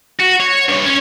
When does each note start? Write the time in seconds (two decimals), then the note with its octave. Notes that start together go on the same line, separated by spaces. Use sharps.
0.20 F#4
0.40 C#5
0.69 G2 C#5
0.86 C#4 C#5